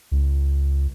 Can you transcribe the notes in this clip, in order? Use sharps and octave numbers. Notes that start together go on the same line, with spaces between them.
C#2